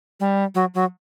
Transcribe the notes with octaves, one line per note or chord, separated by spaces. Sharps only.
G3
F#3
F#3